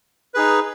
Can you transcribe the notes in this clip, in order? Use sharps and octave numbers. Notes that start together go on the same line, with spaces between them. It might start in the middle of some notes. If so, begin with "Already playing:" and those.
D#4 G#4 B4